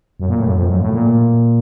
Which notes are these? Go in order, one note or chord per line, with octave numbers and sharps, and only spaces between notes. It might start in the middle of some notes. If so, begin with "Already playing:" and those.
F#2
A#2
A2
F#2
F2
F#2
A2
A#2